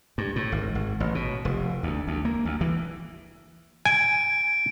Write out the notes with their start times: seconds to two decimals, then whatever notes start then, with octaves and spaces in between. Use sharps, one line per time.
0.18 G2
0.36 A2
0.52 G#1
0.75 G#1
1.00 A1
1.15 B2
1.45 F1
1.83 D2
2.07 D2
2.25 A#3
2.45 D2
2.61 E3
3.85 G#5 D7